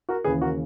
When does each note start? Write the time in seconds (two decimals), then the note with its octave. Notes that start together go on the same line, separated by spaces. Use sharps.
0.09 F#4 A#4
0.24 D#2 C#3 E3 G#4 B4
0.41 F#4 A#4